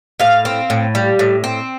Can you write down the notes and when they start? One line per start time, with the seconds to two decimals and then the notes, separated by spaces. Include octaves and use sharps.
0.20 A2 F5
0.45 C4
0.70 A2
0.95 G3
1.19 A2
1.44 C4